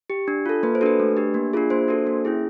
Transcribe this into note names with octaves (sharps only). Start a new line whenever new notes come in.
G4
D4
F4 A4
A#3 B4
C5
D4 F#4 A4 B4
A3
D4 G4
A#3
D4 F4 G#4
A#3 C5
D4 F#4 A4
A#3
C#4 E4 G#4